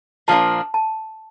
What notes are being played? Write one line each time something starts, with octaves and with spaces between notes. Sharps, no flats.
A#2 F3 A#3 D4 A5
A5